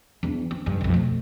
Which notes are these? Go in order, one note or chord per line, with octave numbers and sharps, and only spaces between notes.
E2 D4
C4
F1 G2
B1 F2
B2 A3